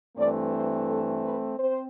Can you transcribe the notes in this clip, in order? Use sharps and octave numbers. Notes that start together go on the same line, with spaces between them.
G2 E3 A3 C4 D5
C5
A4
B4
C4 C5